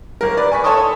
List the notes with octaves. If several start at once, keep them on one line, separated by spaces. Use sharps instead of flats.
G1 A#4
B4 D5
G#5 C#6 B6
A4 C#5 A5 C6 C#6 D#6